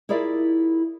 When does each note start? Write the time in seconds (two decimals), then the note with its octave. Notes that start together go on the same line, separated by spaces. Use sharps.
0.09 E4 F4 G#4 A#4 D5 E5